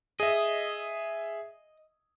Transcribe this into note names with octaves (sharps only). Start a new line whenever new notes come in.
G#4 D#5 E5